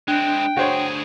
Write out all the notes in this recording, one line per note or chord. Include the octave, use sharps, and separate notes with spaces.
G#3 C4 D4 G5 F#6
D2 F#4 G#4 C5 C#5